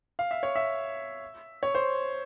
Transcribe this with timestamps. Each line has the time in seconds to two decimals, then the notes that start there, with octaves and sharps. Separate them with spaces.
0.19 F5
0.31 E5
0.43 C#5
0.55 E5
1.63 C#5
1.75 C5